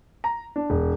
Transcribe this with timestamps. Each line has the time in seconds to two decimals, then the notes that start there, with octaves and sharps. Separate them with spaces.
0.24 A#5
0.56 D4
0.70 E1